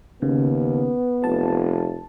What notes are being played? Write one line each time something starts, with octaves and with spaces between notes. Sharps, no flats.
D#2 C#3 B3
F1 A5